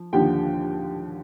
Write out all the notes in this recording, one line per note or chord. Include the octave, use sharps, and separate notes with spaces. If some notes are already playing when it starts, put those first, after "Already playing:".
Already playing: F3
D#2 D3 F3 G4 G5